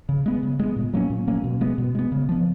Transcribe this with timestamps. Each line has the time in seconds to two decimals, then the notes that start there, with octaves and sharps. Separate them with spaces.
0.09 C#3
0.26 G#3 B3
0.43 C#3
0.60 G#3 B3
0.76 A#2
0.93 F#3 A#3 C#4
1.10 A#2
1.27 F#3 A#3 C#4
1.44 B2
1.61 G#3 B3
1.78 B2
1.95 G#3 B3
2.12 C#3
2.29 F3 B3